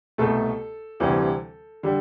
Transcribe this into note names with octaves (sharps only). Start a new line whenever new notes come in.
C2 B2 A3 A4
D2 C3 E3 G3
D3 G3